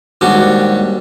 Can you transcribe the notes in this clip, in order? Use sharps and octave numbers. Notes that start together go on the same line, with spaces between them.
D#2 G#2 G3 D4 F#4